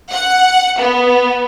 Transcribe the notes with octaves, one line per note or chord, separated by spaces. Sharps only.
F#5
B3